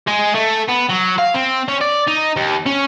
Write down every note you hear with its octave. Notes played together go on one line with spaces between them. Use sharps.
G#3
A3
B3
F#3
F5
C4
C#4
D5
D#4
D#2
C#4